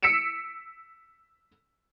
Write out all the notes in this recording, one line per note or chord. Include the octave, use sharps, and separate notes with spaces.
E6 B6 C#7 D7 E7